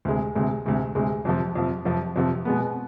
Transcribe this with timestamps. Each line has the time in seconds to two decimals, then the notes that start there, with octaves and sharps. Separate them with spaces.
0.05 D2 C3 G#3
0.35 D2 C3 G#3
0.66 D2 C3 G#3
0.95 D2 C3 G#3
1.25 F2 C3 F3
1.55 F2 C3 F3
1.85 F2 C3 F3
2.16 F2 C3 F3
2.45 B2 G#3 B3